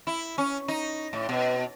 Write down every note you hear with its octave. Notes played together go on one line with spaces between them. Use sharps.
E4
C#4
D#4
A2
B2